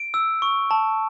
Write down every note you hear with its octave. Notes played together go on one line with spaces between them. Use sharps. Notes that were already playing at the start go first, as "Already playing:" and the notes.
Already playing: D7
E6
C#6
A5